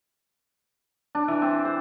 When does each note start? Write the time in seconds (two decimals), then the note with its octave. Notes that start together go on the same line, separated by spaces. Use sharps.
1.15 D4
1.28 E3
1.42 C4
1.65 C5